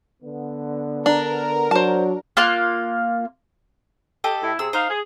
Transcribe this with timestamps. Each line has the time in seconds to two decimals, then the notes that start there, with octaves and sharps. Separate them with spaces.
0.23 D3 B3
1.06 D4 A#4
1.71 F#3 D4 F#4 C5 A5
2.37 A#3 F4 F5 F#6
4.24 G4 A4 D#5
4.43 A2 E4
4.59 C3 G#4 E6
4.73 D#4 C5 F5
4.90 G#4